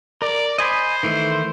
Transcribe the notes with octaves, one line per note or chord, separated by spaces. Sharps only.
A#4 D5
C5 D#5 G#5 B5
D#3 E3 A3